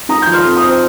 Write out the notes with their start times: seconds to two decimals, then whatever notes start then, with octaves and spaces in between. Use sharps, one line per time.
0.09 D#4 A#5 D#6
0.22 F3 G6
0.34 C6 F6
0.44 F2
0.56 A#5 D#6
0.63 C4